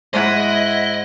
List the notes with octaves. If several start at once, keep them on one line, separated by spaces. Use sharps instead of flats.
G#2 G#3 E4 C5 D#5 F#5